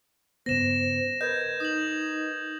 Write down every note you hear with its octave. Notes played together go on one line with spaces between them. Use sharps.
G2 C#3 B3 C5 A#6 E7
A#4 B4 D#5 G6 G#6
D#4 D#6 F#7